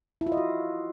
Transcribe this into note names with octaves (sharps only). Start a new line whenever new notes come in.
E4
F4
D#5
F#4